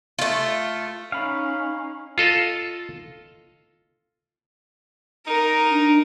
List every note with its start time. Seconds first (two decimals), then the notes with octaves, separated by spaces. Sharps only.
0.19 A3 F4
1.12 C#4 D#4 F5 B5
2.18 F4 A4 D#5
5.27 D#4 A#4
5.71 D4